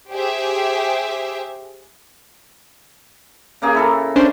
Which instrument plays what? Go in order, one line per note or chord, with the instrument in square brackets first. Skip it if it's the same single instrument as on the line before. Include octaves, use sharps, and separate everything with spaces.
[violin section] G4 G#4 C5 E5
[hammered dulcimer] C#3 A#3 G#4
E4 A4 A#4
[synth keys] C#4 D4 C5